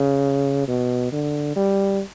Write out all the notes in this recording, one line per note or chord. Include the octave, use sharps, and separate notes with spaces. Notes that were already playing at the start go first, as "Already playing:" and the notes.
Already playing: C#3
B2
D3
G3